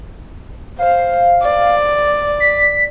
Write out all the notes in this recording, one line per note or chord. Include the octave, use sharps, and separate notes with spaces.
C5 F5
D5
B6